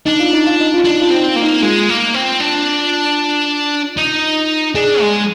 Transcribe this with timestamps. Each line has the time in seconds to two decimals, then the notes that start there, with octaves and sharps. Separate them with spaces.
0.06 D4 D#4
0.20 F4
0.33 D#4
0.47 F4
0.60 D#4
0.74 F4
0.85 D4 D#4
1.01 F4
1.10 C4 D#4
1.29 F4
1.36 A#3
1.43 D#4
1.62 G#3 F4
1.89 A#3
2.14 C4
2.40 D4
3.97 D#4
4.75 D4 G#4
5.01 G#3